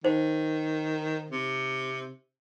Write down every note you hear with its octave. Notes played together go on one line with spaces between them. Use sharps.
D#3 D#4 C5
C3